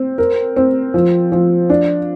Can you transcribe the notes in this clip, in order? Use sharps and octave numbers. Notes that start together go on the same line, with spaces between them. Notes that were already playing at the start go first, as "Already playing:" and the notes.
Already playing: C4
A#4
C4
F3
F3
D4